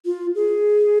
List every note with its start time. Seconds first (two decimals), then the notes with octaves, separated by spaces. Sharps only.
0.05 F4
0.35 G#4